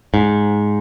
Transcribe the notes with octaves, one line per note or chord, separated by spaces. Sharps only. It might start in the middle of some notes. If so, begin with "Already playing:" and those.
G#2